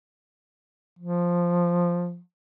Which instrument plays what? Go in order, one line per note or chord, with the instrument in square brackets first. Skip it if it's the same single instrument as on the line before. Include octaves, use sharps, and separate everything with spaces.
[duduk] F3